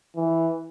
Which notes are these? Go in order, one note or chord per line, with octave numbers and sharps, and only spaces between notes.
E3